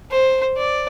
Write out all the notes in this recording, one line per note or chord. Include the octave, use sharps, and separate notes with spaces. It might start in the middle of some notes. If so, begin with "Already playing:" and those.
C5
D5